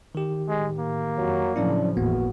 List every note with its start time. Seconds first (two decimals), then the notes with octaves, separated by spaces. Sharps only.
0.15 D#3 G4
0.49 A2 G#3
0.79 A#3
1.18 F2 F#3
1.56 A2 C#3 F3 F#3 C#4 D4 E4
1.97 G1 E2 A2 A#3 B3 F#4